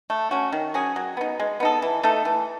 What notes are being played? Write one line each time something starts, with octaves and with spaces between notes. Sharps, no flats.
A3
C#4 F#4
D#3
F#3 C#4 G#4
F#3
B3 D#4
G#3
B3 D#4 A4
E3
A3 D#4 A4
E3